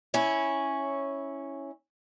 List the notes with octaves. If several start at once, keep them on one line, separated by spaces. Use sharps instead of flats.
C#4 E4